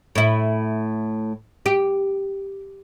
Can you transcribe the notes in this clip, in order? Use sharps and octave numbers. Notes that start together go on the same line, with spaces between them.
A2 E4
G4